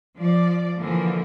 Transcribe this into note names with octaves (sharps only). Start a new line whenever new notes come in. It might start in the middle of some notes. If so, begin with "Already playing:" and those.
F3 D5
D3 E3 F3 A#3